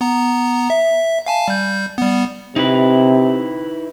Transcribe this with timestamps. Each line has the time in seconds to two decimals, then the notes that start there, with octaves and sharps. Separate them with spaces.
0.01 B3 A#5
0.70 E5
1.26 F5 G#5 A5
1.48 G3 G6
1.98 G3 B3
2.56 C3 D#4 E4 B4